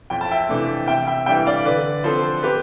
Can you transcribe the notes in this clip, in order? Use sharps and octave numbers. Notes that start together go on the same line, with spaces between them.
F2 G5
A5
E5 G5
C3 E3 A3 D4
C3 E5 G5
E5 G5
E3 G3 D4 E5 G5
D5 F5
D3 B4 D5
F3 C4 A4 C5
G4 B4